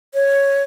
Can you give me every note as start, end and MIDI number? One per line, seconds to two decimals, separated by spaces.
0.14 0.63 73